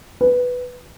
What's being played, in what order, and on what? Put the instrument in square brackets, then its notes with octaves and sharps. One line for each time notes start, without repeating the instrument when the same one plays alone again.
[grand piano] B4